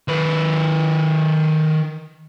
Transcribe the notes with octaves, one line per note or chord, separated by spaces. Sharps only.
D#3 B4